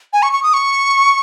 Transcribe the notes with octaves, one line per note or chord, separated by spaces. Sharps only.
G#5
C#6
C#6
D#6
C#6